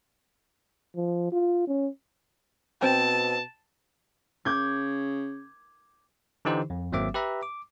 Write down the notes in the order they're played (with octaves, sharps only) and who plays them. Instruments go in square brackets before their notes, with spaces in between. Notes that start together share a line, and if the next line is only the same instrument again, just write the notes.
[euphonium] F3
F4
C#4
[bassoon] B2 [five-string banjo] C4 [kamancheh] A5
[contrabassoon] C#3 [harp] D6 G6 G#6
[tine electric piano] D3 E3 D#4 G4 C5
F2
G#1 F#3 A#3 C4 E5 D6
G4 B4 E5 A#5
D6